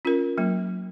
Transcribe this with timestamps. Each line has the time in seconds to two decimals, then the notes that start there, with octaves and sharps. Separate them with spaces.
0.05 C#4 F4 A#4
0.38 F#3 A#3